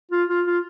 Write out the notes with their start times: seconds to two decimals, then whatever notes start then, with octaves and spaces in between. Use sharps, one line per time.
0.11 F4
0.29 F4
0.46 F4